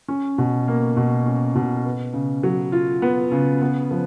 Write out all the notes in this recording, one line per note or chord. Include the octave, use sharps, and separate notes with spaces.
C#4
B2
A#3
B2
C#4
B2
B3
C#3
F#3
F4
B3
C#3
B3
F3